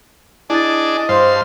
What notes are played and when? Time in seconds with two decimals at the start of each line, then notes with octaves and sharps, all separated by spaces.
0.50 D4 E4 G#4 D5 D#5 A5 A6
1.09 G2 C5 F5 C6